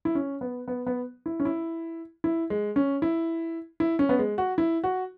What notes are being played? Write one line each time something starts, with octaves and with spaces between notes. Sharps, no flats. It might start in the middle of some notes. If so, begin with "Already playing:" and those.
E4
C#4
B3
B3
B3
E4
C#4
E4
E4
G#3
C#4
E4
E4
C#4
B3
G#3
F#4
E4
F#4